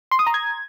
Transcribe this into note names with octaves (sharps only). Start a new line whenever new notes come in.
C6
D#6
A#5
G#6